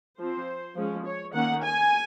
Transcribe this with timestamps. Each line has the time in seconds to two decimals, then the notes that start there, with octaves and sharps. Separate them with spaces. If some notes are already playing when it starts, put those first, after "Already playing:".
0.19 F3 C4 C5
0.76 F3 G#3 C#4
1.05 C#5
1.34 D#3 A#3 C#4 F#5
1.62 G#5